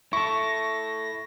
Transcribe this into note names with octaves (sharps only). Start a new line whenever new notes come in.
E4 A4 C#6 A#6